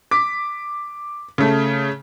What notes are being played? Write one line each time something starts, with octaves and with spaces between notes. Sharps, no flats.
D6 B6
C#3 A3